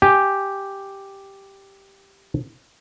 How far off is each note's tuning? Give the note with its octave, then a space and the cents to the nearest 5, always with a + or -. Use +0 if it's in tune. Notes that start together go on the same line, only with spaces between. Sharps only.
G4 +0 G#5 +0